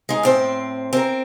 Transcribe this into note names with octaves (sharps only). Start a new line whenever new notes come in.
G#3 D#4
A2 C4 C5
C4 A#4